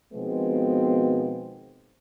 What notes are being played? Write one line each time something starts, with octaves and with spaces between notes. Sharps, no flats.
B2 D#3 F3 G#3 B3 C4